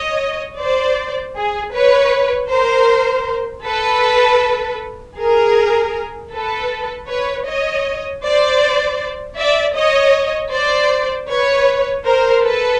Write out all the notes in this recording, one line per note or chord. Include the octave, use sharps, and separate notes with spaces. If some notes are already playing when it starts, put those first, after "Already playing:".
Already playing: C#5 D#5
C5 D5
G#4
B4 C#5
A#4 C5
A4 B4
G#4 A#4
A4 B4
B4 C#5
C#5 D#5
C5 D5
D5 E5
C#5 D#5
C5 D5
B4 C#5
A#4 C5
A4 B4